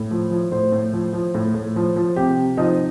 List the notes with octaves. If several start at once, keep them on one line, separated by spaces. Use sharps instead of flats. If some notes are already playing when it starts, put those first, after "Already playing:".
Already playing: A2
F3
F3
A2 C5
A2
F3
F3
A2
A2
F3
F3
C3 G4
C3
F3 D#4